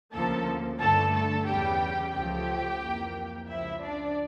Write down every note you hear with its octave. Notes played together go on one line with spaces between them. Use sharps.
D2 C#3 F3 A#3 A4 A5
G2 D3 A3 A4 A5
A4 A5
E2 C#3 G3 G4 G5
C#2 C#3 F3 A3 G4 G5
F2 E3 A#3
C#2 C#3 F3 E4 E5
D4 D5